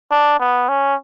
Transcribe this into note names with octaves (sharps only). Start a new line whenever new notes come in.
D4
B3
C#4